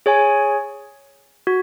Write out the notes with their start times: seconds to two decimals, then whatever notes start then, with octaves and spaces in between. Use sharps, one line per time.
0.06 G#4 C#5 G#5
1.47 F#4